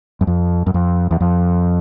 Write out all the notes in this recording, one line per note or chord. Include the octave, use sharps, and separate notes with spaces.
F#2
F2
F#2
F2
E2
F2